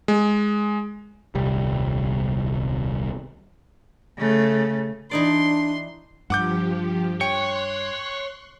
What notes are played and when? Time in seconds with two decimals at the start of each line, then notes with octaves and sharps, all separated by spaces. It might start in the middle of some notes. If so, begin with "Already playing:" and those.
0.08 G#3
1.35 D#1 C2 C3 G3
4.17 C#3 A3
5.11 E3 D4 D#4 D5 C6
6.30 G2 F3 G4 F#5 D6 G6
7.21 C#5 G5 C6 C#6 F#6 C#7